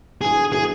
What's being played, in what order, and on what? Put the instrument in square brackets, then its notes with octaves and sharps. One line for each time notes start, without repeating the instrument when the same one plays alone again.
[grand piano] D3 F#3 B3 E4 [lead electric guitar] G#4
[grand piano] D3 F#3 B3 E4 [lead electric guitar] G#4